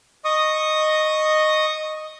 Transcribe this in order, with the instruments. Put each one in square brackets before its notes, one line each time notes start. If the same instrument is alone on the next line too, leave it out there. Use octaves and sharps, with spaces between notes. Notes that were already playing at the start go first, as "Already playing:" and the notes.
[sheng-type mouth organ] D#5 C#6 D#6